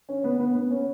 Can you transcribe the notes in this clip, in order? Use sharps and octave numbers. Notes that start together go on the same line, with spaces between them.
C#4
B3
B3
B3
C#4